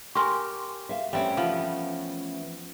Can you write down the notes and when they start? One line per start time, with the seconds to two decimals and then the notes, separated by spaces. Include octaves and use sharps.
0.15 G4 A#4 G#5 C6 C#6
0.89 E5 F5
1.13 E3 G3 A3 C4 C#4
1.37 F3 B3